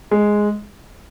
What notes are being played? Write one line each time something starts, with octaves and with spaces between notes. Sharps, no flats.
G#3